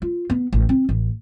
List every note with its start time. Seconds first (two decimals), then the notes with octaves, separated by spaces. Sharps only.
0.02 F4
0.30 B3
0.53 A1
0.69 C4
0.89 A1